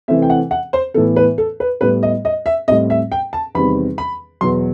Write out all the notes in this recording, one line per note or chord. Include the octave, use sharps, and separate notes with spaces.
C3 E3 A3 C4 E5
G5
F#5
F#5
C5
A2 E3 B3 A4
B4
A4
B4
A2 G3 B3 B4
D#5
D#5
E5
A2 G3 C4 D#5
E5
G5
A5
E2 C3 D#3 G3 C4 B5
B5
E2 B2 F#3 C6